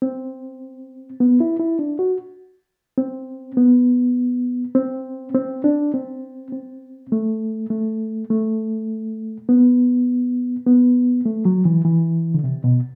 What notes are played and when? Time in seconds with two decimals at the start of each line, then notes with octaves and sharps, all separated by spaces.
0.02 C4
1.20 B3
1.40 E4
1.59 E4
1.79 D4
1.99 F#4
2.98 C4
3.57 B3
4.75 C4
5.34 C4
5.64 D4
5.94 C4
6.52 C4
7.12 A3
7.70 A3
8.30 A3
9.49 B3
10.66 B3
11.26 A3
11.45 F#3
11.65 E3
11.85 E3
12.34 D3
12.44 C3
12.64 B2